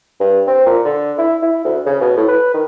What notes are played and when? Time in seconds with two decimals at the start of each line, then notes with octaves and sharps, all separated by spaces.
0.20 G2
0.47 C4
0.66 A#2
0.85 D3
1.18 E4
1.42 E4
1.64 D2
1.86 C#3
2.01 B2
2.17 A2
2.28 B4
2.54 D#3